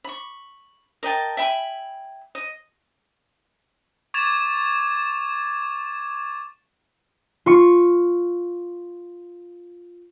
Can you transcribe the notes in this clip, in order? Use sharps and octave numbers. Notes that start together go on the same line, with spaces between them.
B5 C#6
A#4 D#5 G5 A5
E5 G5 G#5 B5
D#5
C#6 D6 G#6 A6 E7 F7
F4 C#6 C#7